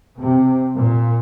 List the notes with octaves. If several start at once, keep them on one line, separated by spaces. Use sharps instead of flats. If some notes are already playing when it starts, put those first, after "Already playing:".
C3
A#2